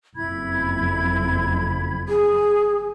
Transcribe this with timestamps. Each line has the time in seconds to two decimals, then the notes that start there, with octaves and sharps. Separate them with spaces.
0.16 F#1 F2 E4 B5 G#6
2.09 G#4 G#5